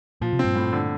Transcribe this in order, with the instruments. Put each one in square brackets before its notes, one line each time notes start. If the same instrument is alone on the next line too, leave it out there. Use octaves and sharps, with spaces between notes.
[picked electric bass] A#2 [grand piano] F3
[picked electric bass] C3
[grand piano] C4
[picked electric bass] G2 A#2
[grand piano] A2
D3